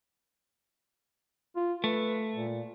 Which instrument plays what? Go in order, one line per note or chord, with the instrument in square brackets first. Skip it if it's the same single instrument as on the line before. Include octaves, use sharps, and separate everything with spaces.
[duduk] F4
[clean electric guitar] A3 [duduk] B4
[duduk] A#2